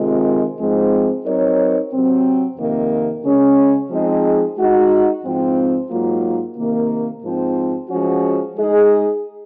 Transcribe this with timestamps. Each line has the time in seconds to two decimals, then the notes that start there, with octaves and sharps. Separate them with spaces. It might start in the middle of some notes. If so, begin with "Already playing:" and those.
Already playing: C3 D#3 G#3 C4 F4
0.59 G#2 F3 G#3 C4
1.25 F#3 C4 D#4 A#4 C#5
1.92 C3 F#3 C4
2.57 F2 C3 D#3 A#3
3.24 C#3 G#3 C#4
3.90 F3 G#3 C4 D#4 G#4
4.57 G#3 D#4 F#4
5.24 G#2 F3 C4
5.90 G#2 F#3 A#3 F4
6.56 C3 D#3 A#3
7.23 G#2 F3 C4
7.89 F3 G#3 C#4 F#4
8.55 G#3 D#4 G#4 D#5